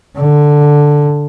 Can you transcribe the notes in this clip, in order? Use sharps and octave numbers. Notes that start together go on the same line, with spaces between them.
D3